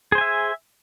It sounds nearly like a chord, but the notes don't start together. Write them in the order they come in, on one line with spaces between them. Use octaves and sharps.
G#4 C5 G#5 E5